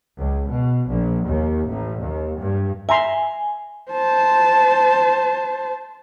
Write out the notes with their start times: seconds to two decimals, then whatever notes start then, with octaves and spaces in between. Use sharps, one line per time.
0.19 C#2
0.48 B2
0.89 A#1
1.26 D#2
1.69 A1
2.03 D#2
2.39 G2
2.89 E5 G#5 A#5 C6
3.91 C5 A5